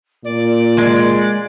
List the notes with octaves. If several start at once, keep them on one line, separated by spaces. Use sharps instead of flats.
A#2 D5
G#3